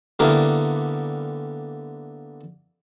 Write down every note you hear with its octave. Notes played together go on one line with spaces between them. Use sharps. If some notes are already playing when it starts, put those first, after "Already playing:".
D3 G3 A#3 B3 E4 A#4